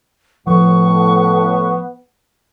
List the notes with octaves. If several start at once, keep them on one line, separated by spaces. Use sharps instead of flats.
A2 F3 B3 C#6